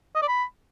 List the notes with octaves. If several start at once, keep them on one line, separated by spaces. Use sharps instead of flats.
D#5
D5
B5